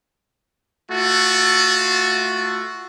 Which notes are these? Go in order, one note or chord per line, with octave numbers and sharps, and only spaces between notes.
A3 F4 F#4